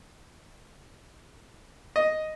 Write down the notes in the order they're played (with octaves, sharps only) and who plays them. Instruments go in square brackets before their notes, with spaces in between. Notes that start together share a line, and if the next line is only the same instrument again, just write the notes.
[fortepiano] D#5